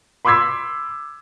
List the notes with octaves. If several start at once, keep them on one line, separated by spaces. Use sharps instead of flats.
B5 C6 D6 E6 G#6 B6